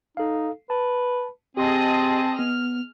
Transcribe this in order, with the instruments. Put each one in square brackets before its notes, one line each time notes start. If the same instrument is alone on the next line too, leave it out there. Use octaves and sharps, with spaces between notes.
[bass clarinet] D#4 [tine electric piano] A4 F5
[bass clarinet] B4 [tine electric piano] A5
[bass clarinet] C4 [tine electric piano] G4 C6 [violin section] G#4 D#5 A5
[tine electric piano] B3 [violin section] F6